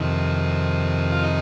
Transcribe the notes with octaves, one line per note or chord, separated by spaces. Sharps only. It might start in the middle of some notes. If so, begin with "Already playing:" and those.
Already playing: F2 C3 D#3
F4
D#4